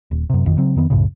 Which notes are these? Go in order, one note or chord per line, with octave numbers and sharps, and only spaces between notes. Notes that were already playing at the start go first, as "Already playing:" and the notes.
D#1
F#2 C3
G#1 F2 D#3
C#3 F#3 C4
F2 D#3 B3
C2 F#2 A2 C#3